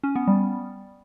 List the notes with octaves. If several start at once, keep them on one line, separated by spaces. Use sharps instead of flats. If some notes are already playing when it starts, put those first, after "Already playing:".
C#4
B3
G3